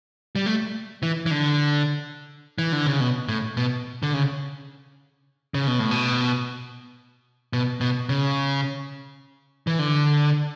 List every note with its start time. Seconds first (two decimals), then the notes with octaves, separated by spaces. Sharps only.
0.36 G3
0.46 A3
1.03 E3
1.26 E3
1.31 D3
2.58 E3
2.72 D3
2.87 C#3
3.00 B2
3.28 A2
3.57 B2
4.03 D3
4.14 C#3
5.54 C#3
5.67 B2
5.79 A2
5.91 B2
7.53 B2
7.81 B2
8.09 C#3
9.67 E3
9.79 D3